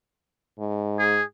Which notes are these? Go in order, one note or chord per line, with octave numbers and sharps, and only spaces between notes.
G#2
G#4